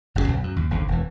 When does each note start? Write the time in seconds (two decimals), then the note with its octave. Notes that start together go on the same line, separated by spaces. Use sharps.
0.15 F#1 F#2 A#2 C#3
0.28 B1
0.43 F#2
0.56 D#2
0.70 G#1 D#2 D3
0.88 E1 E3